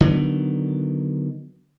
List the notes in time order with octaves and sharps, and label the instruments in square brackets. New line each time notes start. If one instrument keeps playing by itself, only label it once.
[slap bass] D3 D#3 F#3 B3